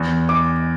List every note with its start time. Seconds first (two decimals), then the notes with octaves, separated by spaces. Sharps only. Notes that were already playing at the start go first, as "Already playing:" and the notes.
Already playing: E2
0.29 D6